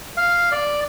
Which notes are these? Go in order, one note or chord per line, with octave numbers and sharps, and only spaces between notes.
F5
D5